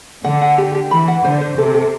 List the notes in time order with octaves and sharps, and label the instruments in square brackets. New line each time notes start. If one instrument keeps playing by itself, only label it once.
[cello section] D3 [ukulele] F#5
[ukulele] F#5
G4
G4
[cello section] E3 [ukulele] B5
[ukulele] F#5
[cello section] D3 [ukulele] C5
[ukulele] C5
[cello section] C3 [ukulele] A4
[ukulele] A4